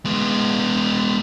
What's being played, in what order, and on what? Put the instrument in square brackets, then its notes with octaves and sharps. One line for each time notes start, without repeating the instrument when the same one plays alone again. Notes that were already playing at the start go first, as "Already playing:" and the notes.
[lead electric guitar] G#3 B3